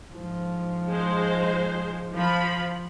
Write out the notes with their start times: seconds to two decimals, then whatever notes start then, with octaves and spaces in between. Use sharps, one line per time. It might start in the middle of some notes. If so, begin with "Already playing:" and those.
0.13 G#2 F3
0.87 G#3 C5
2.14 F3 B5